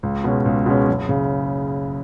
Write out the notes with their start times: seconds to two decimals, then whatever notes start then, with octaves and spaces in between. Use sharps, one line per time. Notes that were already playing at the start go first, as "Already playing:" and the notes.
0.03 C#2
0.24 B2 G#3 C#4
0.45 C#2
0.66 B2 G#3 C#4
0.88 F#1
1.09 C#3